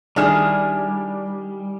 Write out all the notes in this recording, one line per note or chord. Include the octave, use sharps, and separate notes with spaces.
D#3 G3 D4 E4 G#4 F6 E7